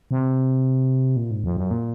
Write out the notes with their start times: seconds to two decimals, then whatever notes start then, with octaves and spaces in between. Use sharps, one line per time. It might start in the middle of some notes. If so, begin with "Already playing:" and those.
0.11 C3
1.16 A#2
1.31 G#2
1.44 F2
1.56 F#2
1.71 A#2